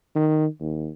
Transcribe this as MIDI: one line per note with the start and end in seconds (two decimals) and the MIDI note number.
0.15 0.46 51
0.60 0.90 39